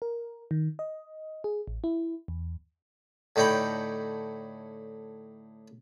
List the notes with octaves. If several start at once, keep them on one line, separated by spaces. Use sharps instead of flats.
A#4
D#3
D#5
G#4
A1
E4
E2
A2 D3 D#4 C#5 G5 B5